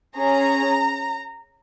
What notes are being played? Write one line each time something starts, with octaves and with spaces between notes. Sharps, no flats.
C#4 G#4 A#5